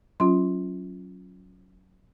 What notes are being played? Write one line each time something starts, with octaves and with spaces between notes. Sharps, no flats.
F#3 C#4 F4 C6